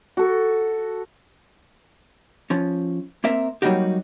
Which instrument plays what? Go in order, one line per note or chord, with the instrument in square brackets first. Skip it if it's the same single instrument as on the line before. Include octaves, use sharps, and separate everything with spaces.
[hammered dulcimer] F#4 A4
[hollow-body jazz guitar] F3 C#4
A#3 C4 A#4 E5
F#3 G3 A#3 D#4 F#4 G4